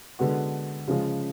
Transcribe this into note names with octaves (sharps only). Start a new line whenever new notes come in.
D3 G#3 B3 F#4
C#3 F3 G#3 C#4